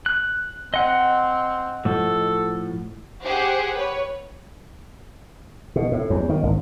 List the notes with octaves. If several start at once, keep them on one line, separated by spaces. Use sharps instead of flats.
F#6
C4 D#5 F#5
A2 F3 F#4 A4
G4 G#4 C5 F#5
B4 C#5
B2
A2
E2
D#3
G#1